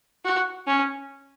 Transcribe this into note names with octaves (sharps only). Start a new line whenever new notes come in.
F#4
C#4